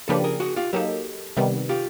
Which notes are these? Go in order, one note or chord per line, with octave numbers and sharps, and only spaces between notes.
C#3 F3 A#3 D4 G4 A4 B4
G#4 A#4
F#4 G#4
F4 G4
F#3 A#3 D#4 G4 A4
C3 D#3 G3 B3
F4 G4